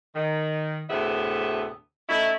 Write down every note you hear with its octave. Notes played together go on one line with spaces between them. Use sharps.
D#3
D2 A2 C3 B3 G#4 E5
A3 C#4 D#4 E4